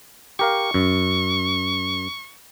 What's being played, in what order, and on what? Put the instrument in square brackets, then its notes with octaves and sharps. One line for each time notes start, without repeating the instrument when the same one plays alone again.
[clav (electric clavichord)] G4 A#4 F5 [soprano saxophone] C#6
[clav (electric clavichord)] F#2